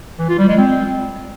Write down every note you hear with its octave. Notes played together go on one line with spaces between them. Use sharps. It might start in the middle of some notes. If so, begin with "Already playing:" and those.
E3
F4
G3
G#3
C4